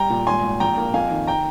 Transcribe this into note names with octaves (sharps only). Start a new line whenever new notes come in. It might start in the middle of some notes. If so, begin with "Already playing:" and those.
Already playing: G3 G5 A#5
A#2
G#1 G#5 C6
G#1
A#1 G5 A#5
A#3
F2 F5 G#5
D#3
G5 A#5